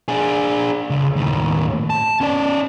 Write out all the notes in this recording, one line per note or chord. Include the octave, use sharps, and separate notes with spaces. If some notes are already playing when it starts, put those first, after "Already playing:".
D4 G#4
C#2
D#2 A2
A5
C#4 D5